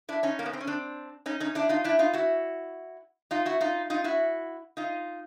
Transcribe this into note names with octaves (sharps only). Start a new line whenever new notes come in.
D4 E4
C#4 D#4
A#3
B3
C4
C#4
C4 D4
C#4 D#4
C#4 D#4
D4 E4
D#4 F4
D4 E4
D#4 F4
E4 F#4
D#4 F4
E4 F#4
D#4 F4
D#4 F4
E4 F#4
D#4 F4